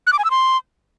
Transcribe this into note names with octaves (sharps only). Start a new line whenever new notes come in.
F#6
D6
G#5
E6
C6